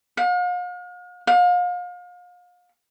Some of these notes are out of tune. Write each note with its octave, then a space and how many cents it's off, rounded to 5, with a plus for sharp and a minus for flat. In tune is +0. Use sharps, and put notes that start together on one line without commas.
F5 +45
F5 +35